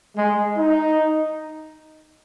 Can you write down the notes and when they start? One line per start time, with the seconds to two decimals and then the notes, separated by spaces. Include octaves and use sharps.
0.16 G#3
0.57 D#4